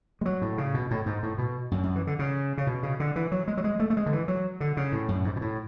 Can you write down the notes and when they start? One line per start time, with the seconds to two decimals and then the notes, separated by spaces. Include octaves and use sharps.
0.21 G#3
0.26 F#3
0.42 A2
0.58 C#3
0.74 B2
0.91 A2
1.06 G#2
1.23 A2
1.38 B2
1.71 F#2
1.83 F#2
1.96 E3
2.07 D3
2.19 C#3
2.58 C#3
2.67 B2
2.83 C#3
3.00 D3
3.16 E3
3.32 F#3
3.48 G#3
3.57 F#3
3.64 G#3
3.80 A3
3.90 A3
3.97 G#3
4.06 D3
4.13 E3
4.28 F#3
4.61 D3
4.77 C#3
4.92 A2
5.08 F#2
5.25 G#2
5.36 B2
5.41 A2